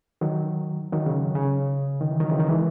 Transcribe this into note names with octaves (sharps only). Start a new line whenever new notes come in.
D#3 F#3
D#3 F#3
C#3
C#3
D#3
E3
D#3 F#3
C#3 E3
D#3 F#3
E3 G#3